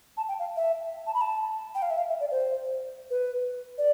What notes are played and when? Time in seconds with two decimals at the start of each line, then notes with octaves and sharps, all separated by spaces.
0.17 A5
0.28 G5
0.39 F5
0.56 E5
1.07 A5
1.14 B5
1.21 A5
1.75 G5
1.82 F5
1.90 E5
1.98 F5
2.09 E5
2.20 D5
2.31 C5
3.10 B4
3.78 D5